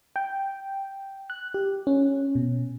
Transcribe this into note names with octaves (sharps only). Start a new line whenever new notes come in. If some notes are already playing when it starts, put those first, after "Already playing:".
G5
F#6
G4
C#4
B2